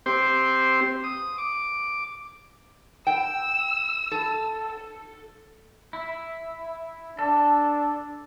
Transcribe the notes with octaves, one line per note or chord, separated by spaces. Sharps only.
C4 G4 C5
D#6
D6
G5 E6
A4
E4
D4 A4